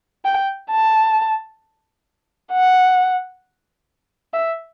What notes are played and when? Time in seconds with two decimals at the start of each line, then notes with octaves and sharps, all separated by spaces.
0.25 G5
0.71 A5
2.52 F#5
4.33 E5